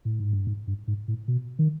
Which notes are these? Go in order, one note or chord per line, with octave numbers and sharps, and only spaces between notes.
A2
G#2
G2
G#2
G2
G#2
A2
B2
D#3